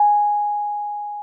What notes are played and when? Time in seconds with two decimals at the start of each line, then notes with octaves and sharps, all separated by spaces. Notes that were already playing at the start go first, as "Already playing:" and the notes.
Already playing: G#5